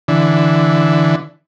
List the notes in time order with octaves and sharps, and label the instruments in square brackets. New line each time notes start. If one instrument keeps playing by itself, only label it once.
[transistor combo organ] D3 E3